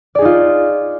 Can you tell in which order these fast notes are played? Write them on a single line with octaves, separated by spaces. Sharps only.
D5 G#4 D#4 F4